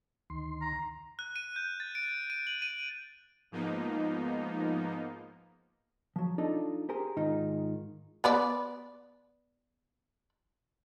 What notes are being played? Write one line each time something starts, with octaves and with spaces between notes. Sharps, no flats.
D2 D#3 C6
A#5
F#6
D#7
G6
A6
D7
D#7
F#7
D#7
G#2 F3 A#3 B3 D#4
F3 F#3
D4 D#4 F4 A4 D5 D#5
G4 G#4 A#4 C5
G#2 D#3 D#4 F4
B3 B4 D5